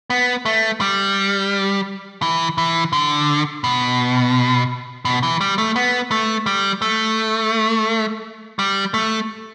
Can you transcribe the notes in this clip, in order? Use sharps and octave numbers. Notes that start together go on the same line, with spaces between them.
B3
A3
G3
E3
E3
D3
B2
B2
E3
G3
A3
B3
A3
G3
A3
G3
A3